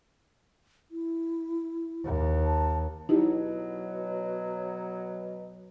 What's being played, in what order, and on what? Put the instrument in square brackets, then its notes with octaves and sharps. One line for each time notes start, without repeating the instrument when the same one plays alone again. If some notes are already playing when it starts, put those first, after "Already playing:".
[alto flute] E4
[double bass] D#2
[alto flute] A5
[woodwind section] B2 F#3 [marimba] D#4 E4 G4